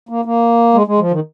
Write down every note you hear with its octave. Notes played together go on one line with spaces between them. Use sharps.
A#3
A#3
G#3
G#3
F3
D#3